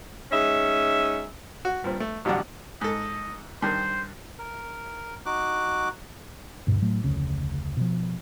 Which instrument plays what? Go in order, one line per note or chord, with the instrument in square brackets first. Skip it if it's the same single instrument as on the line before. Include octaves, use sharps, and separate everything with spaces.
[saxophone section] G#3 C#4 D#4 E5
[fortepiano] F#4
G2 A#2 C4
A3
A1 D3 F#3 G3 D4 F#5
[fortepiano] G#2 A4 [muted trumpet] D#5
[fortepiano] G2 D#3 [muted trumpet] C5
[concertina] A#4
D#4 F#4 D6 F#6
[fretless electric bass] D2 G2 B2
A2 F#3 A3
F1 D2 C#3
B2 F3